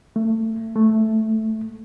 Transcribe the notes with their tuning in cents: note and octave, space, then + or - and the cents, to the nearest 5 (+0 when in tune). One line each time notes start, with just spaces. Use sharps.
A3 +25
A3 +0